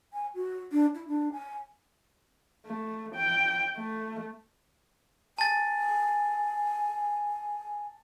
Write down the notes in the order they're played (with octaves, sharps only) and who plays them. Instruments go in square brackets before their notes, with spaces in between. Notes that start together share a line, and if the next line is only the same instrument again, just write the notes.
[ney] G#5
F#4
D4
E4
D4
G#5
[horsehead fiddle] A3
G5
A3
[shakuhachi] G#5 [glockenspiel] A5 A6